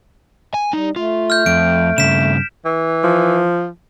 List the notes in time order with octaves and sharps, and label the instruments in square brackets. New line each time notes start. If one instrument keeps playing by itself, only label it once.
[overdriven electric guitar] G#5
[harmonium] G3 [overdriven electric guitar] D#4
[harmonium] A3 [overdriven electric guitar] F4
[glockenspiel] F6 G6
[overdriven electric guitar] F2 [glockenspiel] D7
[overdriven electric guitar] G2 C#3 [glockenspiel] B6 E7
[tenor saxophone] E3
[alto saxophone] F3